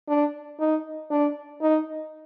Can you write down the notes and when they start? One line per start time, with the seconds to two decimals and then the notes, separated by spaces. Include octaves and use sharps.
0.09 D4
0.60 D#4
1.11 D4
1.62 D#4